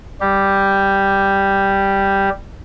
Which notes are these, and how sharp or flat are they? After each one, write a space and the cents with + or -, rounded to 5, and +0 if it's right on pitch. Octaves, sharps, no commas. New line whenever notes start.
G3 +0 G4 +0